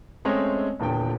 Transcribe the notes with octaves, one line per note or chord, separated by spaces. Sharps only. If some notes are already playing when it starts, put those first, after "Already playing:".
G#3 A3 C4 C#4 C#5 D#5
D#1 E2 A#2 D3 G5